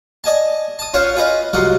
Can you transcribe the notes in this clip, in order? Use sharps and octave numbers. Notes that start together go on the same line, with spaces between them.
D5 D#5 G#5 A5
A5 D#6
C#4 F4 C5 C#5 F#5
F4 G#4 B4 D#5
C2 F#3 G#3 F4 F#5